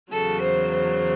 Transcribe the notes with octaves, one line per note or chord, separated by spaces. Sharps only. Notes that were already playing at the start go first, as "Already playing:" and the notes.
E2 C#3 F#3 A4
C5
C5